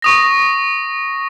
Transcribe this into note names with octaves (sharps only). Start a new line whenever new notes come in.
C#6 D#6 A#6